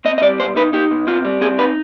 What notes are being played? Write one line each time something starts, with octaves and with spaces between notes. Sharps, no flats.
C4 D#5
D#5
G3 D5
B2 C5
D#4 B4
D#4 G4
B2
C4 F4
G3
C4 G#4
D#4 B4